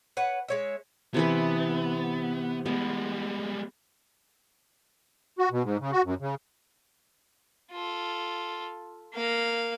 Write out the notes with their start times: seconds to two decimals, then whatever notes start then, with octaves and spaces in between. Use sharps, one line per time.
0.17 B4 C#5 F#5
0.48 G#3 C#5 E5
1.14 C3 E3 B3 B4
2.66 G3 G#3 B3
5.39 F#4
5.51 B2
5.63 G#2
5.80 C#3
5.92 F#4
6.04 F#2
6.20 C#3
7.72 F4 A4
9.14 A#3 F5